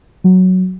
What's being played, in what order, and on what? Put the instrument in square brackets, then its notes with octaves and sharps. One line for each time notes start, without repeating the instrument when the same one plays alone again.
[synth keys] F#3